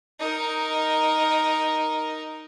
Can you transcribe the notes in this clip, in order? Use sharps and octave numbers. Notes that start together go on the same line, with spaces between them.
D#4 A#4